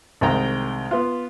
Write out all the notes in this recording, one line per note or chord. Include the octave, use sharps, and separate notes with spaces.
C2 D#3 G#3 G5 A#5
B3 F4